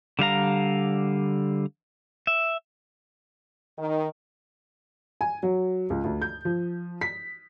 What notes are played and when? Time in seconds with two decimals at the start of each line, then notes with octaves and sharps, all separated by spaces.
0.19 D3 G3 F5 A#5
2.27 E5
3.78 D#3
5.21 G#5
5.43 F#3
5.90 C#2
6.04 D2
6.22 G6
6.45 F3
7.01 B6